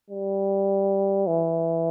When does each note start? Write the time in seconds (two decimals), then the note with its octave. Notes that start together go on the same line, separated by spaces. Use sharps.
0.10 G3
1.27 E3